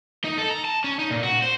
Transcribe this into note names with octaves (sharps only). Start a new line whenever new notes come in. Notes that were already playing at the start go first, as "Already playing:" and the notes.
D#4
A4
A#5
A5
C#4
D#4
A#2
F#4
C5